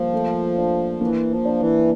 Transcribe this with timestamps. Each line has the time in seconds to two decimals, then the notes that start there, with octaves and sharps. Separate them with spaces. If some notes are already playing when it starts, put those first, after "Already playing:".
Already playing: F3 G3 A#3
0.13 A3
0.57 D4
1.01 E3 A#3
1.30 F3
1.45 D4
1.60 E3